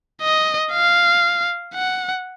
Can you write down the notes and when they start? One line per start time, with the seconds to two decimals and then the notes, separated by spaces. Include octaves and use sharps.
0.22 D#5
0.73 F5
1.75 F#5